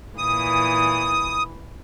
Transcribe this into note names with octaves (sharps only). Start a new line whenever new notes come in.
A#2 E3 D#6